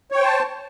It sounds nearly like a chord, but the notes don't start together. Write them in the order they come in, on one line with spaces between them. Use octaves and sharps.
C#5 G5 C5 A5